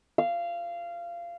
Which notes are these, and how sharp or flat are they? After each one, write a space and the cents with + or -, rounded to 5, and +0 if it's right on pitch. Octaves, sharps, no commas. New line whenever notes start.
F5 -20